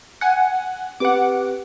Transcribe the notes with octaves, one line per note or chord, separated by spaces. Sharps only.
F#5 G#5
C4 G4 B4 F#5 D6